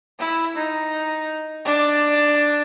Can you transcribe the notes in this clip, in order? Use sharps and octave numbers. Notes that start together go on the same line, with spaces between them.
E4
D#4
D4